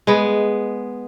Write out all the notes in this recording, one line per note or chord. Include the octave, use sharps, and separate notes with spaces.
G#3 B3